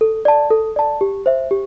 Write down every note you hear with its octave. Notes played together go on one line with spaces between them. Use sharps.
A4
D5 A5
A4
D5 A5
G4
C5 E5
G4